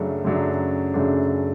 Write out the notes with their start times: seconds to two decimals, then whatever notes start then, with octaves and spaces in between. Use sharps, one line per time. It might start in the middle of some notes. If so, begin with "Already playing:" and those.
Already playing: F#2 C#3 F#3 A3 D4
0.25 F#2 C#3 F#3 A3 D4
0.94 F#2 C#3 F#3 A3 D4